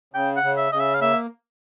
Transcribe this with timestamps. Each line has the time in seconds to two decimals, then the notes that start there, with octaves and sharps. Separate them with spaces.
0.14 C#3 G5
0.37 F#5
0.43 C#3
0.57 E5
0.72 C#3 D#5
0.80 E5
0.95 F5
1.01 A#3 E5